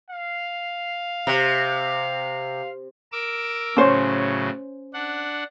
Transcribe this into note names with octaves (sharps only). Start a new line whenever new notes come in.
F5
C3
A#4 D6 E6
A2 C#3 F#3 C#4 C5 C#5
D4 F#5